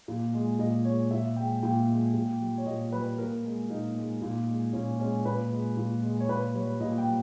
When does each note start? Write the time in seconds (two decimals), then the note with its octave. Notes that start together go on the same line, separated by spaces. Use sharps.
0.08 A#2
0.34 G#3
0.59 A#2 D#5
0.85 G#3 C#5
1.11 A#2 E5
1.36 G#3 G5
1.63 A#2 G5
1.89 G#3
2.14 A#2
2.41 G3
2.58 C#5
2.66 A#2 D#5
2.92 G3 B4
3.18 A#2 A#4
3.44 G#3
3.70 A#2 D#4
3.96 G#3
4.22 A#2
4.48 G#3
4.73 A#2 C#4
4.99 G#3 C#4
5.25 A#2 B4
5.50 G#3
5.77 A#2
6.03 G#3
6.20 C#5
6.28 A#2 B4
6.54 G3 C#5
6.80 A#2 D#5
6.98 G5
7.06 G3